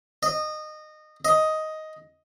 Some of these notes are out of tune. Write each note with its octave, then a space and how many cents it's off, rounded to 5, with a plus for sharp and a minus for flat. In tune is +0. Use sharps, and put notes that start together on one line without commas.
D#5 -20
D#5 +10